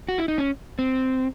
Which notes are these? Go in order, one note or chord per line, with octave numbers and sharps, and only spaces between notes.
F#4
E4
D#4
C#4
C4